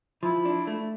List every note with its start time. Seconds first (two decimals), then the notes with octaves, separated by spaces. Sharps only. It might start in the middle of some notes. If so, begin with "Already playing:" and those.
0.23 F3 E4
0.45 D4
0.67 A3